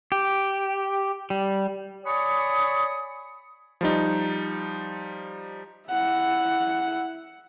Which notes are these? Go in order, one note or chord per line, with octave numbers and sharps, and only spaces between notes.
G4
G3
C#5 D5 G#5 B5 C#6 D#6
F3 G3 D#4
E4 F#5